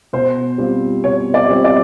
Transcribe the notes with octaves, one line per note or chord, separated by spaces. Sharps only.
B2 C5
G3 C4 F4
B2 C#5
D5
G3 C4 F4
D5